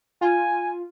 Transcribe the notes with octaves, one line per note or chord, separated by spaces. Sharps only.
F4 G#5